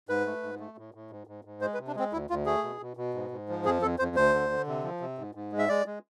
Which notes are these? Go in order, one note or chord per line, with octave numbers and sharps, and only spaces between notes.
G#2 B4
A3
G#2
A3
A2
A2
G#2
G#2
G#2
G#3 C5
B4
C3
D4
G#3 C4
D2 E4
D2 F4
A3 G#4
B2
B2
B2
G#2
G#2
F3
F2 G#4
F2 A4
F2 C5
D2 C5
D3
D3
C3
F3
C3
G#2
G#2
G#3
E5
G#3 D5
G#3